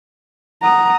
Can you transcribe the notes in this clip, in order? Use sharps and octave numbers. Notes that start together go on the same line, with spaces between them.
F#5 A#5 D#6